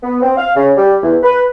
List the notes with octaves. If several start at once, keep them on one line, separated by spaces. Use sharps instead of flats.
B3
C4
F5
C#3
G3
E2
B4